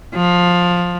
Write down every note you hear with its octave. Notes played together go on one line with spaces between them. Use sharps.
F3